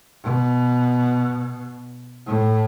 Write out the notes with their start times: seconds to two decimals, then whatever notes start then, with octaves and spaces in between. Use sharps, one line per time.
0.24 B2
2.27 A2